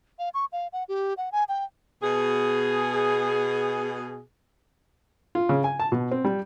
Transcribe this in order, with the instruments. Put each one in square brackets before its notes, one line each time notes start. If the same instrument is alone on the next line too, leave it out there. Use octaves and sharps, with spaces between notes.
[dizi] F5
C#6
F5
F#5
G4
F#5
G#5
G5
[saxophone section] B2 G#4
[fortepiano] F4
C#3
G#5
A5
B2
C4
G3